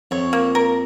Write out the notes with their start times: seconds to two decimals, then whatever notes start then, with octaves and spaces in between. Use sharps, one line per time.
0.11 F2 C#5
0.33 A#3
0.55 A#4